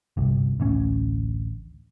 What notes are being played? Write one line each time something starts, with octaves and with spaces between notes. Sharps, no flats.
G1 C2
A1 D2 C#4